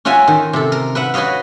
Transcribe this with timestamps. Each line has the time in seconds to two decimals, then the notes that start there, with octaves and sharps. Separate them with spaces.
0.05 C#4 F4 F#4 E5 G#5
0.28 D#3
0.53 C3 A4
0.72 A#4
0.95 B4 E5 F#5
1.14 F#4 B4 C#5 D#5 F5